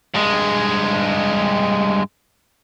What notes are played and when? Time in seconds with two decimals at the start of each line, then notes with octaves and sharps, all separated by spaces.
0.14 G2 G#3